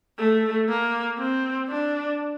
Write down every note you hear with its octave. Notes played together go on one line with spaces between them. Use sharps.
A3
A#3
C4
D4